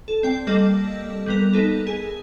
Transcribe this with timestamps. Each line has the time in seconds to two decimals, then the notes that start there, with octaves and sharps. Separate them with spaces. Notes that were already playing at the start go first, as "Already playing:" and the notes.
0.08 A4
0.23 C4 D5 G5
0.47 G3 A#3 A4 D#5
1.26 G3 B3 A#4
1.53 B3 D#4 A4
1.87 G#4